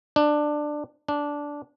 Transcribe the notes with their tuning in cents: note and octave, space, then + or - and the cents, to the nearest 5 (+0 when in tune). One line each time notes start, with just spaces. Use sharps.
D4 +15
D4 -10